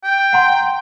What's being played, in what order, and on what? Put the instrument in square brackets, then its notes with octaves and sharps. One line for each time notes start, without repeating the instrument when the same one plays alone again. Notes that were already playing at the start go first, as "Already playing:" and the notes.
[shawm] G5
[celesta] F#5 A#5 C6